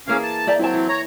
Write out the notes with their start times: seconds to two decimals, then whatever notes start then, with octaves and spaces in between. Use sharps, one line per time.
0.08 E3 A#3 C#4 G#4 F5
0.23 A5
0.47 D5 E5 G5 A#5
0.59 F#3 C4 E4 A5
0.73 E3
0.89 C#5 A#5